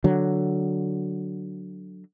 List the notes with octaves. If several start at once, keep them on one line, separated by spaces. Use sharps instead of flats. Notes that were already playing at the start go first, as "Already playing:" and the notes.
D3 F#3